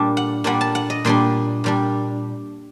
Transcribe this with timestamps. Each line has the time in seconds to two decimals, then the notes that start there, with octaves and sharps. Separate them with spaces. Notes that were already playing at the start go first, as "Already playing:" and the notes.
Already playing: A#2 G3 D4 A5
0.17 F#5
0.44 A#2 G3 D4 F#5
0.61 A5
0.75 F#5
0.90 D#5
1.05 A#2 G3 D4 C6
1.64 A#2 G3 D4